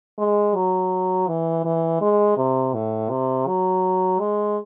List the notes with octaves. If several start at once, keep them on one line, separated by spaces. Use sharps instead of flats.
G#3
F#3
E3
E3
G#3
C3
A2
C3
F#3
G#3